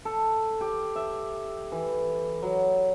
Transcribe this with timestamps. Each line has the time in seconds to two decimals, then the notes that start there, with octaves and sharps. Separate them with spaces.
0.05 A4
0.61 G4
0.96 E5
1.72 E3
2.42 F#3